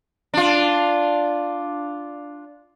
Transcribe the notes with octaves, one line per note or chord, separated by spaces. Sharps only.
D4 F4